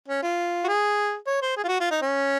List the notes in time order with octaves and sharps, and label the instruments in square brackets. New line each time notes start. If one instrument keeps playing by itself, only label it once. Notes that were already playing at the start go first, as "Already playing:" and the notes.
[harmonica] C#4
F4
F#4
G#4
C#5
C5
G#4
F4
F#4
F4
D#4
C#4